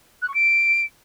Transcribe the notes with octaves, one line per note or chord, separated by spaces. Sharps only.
F#6
C#6
D7